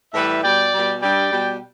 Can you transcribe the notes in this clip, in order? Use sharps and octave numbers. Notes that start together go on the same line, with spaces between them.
A2 E3 G3 B4 E5
B2 G3 D5 G5
B2 G3
G2 G3 D5 G5
B2 G3